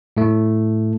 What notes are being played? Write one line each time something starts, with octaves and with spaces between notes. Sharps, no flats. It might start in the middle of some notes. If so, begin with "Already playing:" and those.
A2 A3